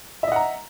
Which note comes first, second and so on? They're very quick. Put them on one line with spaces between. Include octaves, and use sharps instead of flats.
E5 D#5 F#5 A#5